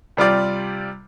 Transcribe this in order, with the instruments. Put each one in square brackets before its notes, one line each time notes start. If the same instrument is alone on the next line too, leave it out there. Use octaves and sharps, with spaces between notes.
[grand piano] C3 G3 F4 D5